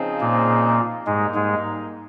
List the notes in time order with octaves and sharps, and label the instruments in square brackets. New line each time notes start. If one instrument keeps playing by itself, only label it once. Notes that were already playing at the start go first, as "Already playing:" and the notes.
Already playing: [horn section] C#3 F3 C4 D#4 G#4
[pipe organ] A#2 A#3
[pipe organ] G#2 G#3 [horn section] G3 A#3 D#4
[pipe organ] G#2 G#3